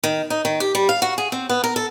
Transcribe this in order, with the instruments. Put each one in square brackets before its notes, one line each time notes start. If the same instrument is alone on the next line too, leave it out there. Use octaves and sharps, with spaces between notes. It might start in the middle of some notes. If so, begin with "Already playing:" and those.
[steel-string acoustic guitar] D#3
D#4
D#3
G4
G3
F5
F#4
G#4
C4
B3
A#4
A4